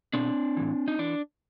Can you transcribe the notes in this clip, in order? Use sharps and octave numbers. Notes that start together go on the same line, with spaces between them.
B2 C4 D4
A2 E3
D#4
E3 D4